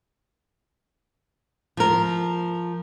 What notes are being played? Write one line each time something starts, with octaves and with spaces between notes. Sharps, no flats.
F3 A#4